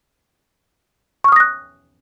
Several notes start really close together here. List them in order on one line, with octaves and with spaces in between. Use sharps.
C#6 F6 D#6 A#6 F#6